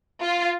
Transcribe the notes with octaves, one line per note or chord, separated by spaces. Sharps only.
F4